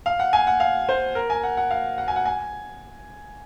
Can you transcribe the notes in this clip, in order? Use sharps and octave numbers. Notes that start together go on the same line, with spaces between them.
F5
F#5
G#5
F#5
F5
C5
A#4
G#5
F#5
F#5
F5
F#5
G#5
F#5
G#5